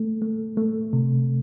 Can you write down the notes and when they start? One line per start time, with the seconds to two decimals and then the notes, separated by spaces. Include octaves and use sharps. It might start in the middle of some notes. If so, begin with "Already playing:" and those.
Already playing: A3
0.22 A3
0.57 A3
0.93 C3